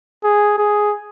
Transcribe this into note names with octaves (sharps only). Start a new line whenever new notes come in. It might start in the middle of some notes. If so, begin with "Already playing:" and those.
G#4
G#4